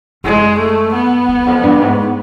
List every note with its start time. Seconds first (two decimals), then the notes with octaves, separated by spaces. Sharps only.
0.24 F#2 G#3
0.59 A3
0.94 B3
1.28 E2
1.47 F2
1.63 G2
1.81 G#2